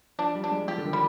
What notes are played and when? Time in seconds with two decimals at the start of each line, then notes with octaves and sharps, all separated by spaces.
0.19 F3 D4
0.35 G3
0.44 D4
0.51 G#3
0.68 F3 G4
0.78 D3
0.85 D#3
0.93 G3